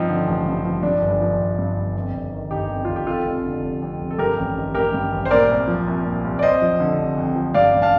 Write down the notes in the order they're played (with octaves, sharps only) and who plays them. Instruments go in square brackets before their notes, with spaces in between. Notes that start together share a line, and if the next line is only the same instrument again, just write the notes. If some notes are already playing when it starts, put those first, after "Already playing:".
Already playing: [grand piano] G2 F3 C4 D#4
D3
A1
G2
F3
G2 D4
G1
D4
F3
G1
G2
G1
F2
G1
D#3
G1 D#4 G4
F2
G1 F4
G4
F2 F4 A4
F1
D3
F1
F2
F1
A4
G2 G4 A#4
A1
D#3
A1 G4 A#4
G2
A1
C5
A#2 A#4 D5
C2
F3
C2
A#2
C2
D5
F2 C5 D#5
F3
D3
F1
F2
F3
G2 D5 F5
A1
F5 A5